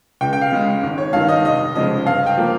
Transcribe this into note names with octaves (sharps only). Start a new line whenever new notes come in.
C#2 G5
G5
F5
C#3 G#3
G#1
C#5
G2 D#3 F5
D#5
F1 D#5
F2 C#3 F3 G#3 D#5
G2 F5
G5
F3 A#3